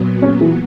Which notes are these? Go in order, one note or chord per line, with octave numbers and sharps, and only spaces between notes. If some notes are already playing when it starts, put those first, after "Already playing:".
Already playing: A#2 F#3 B3
C#4
E3